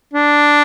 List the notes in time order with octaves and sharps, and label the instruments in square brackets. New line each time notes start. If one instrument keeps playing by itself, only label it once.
[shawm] D4